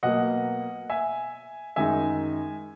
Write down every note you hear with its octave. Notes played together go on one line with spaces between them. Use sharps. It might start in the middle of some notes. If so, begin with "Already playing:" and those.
B2 F#3 A#3 D#5 F#5
E5 G#5
F#2 D#3 G#3 D#4 E5 G#5